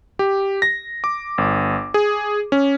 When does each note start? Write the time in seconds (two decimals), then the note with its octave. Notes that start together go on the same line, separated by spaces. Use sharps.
0.19 G4
0.62 A#6
1.04 D6
1.38 G1
1.94 G#4
2.52 C#4